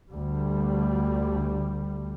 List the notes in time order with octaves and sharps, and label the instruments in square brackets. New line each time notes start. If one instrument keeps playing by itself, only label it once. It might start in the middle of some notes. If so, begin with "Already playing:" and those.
[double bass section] D2 G3